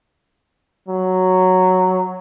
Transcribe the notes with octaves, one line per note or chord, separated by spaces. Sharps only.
F#3